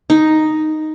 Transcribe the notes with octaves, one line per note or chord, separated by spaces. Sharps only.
D#4